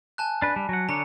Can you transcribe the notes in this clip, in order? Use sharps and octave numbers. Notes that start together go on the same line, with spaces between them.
G#5 A5 F#6
D4 B4
G3
F#3 F#5
D3 D4 C#5 A#5